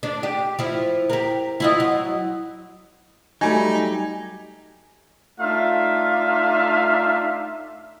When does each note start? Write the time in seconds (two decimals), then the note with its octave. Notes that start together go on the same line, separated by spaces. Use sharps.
0.03 D4
0.23 G4
0.59 F3 E4
1.10 G4 A#4
1.60 E4 F4 D#5
1.80 F#3
3.41 F#3 G3 A3 D#4 G#5
5.39 A3 D4 D#4 F4 E5 F5